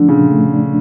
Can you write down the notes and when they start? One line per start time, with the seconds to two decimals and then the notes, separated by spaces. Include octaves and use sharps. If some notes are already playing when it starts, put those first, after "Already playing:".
Already playing: D3 F3 A3 D4
0.09 A#2 C#3
0.31 A3
0.53 D4